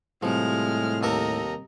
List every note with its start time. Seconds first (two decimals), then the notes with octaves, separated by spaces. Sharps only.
0.23 A2 C3 F3 G3 G#3 F6
1.03 D#2 A4 A#4 D#5 A#5